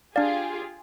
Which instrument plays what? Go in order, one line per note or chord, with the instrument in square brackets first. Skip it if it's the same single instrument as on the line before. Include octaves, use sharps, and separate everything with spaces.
[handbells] D4 D5 [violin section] F4 G4 G#4 [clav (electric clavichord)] F5